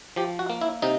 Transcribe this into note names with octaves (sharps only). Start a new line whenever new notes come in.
F3 G4
F#4
A#3
E4
C3 D#4